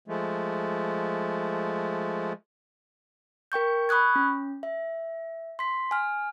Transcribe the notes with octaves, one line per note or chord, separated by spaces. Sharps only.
F3 G#3 A3
A#4 G5 C#6 G6
B5 C#6 D#6 F#6 G#6
C#4
E5
C6 B6
G#5 F6